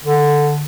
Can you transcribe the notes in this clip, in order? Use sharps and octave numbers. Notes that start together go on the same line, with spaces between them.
D3